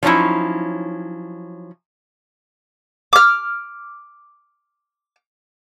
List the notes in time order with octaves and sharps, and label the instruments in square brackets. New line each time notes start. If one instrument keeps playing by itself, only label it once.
[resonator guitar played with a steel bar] F3 F#3 C#4 D#4 E4
[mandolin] D6 F6